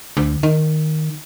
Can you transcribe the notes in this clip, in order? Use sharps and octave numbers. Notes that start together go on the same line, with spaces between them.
D2
D#3